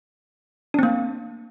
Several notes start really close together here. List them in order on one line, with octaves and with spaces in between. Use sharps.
D4 C4 A#3